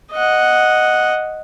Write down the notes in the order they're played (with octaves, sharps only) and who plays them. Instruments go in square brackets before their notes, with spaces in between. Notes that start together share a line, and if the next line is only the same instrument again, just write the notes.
[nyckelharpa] D#5 F#5